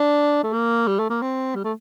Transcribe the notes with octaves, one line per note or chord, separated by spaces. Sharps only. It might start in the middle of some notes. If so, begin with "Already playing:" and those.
Already playing: D4
A3
A#3
G3
A3
A#3
C4
G3
A3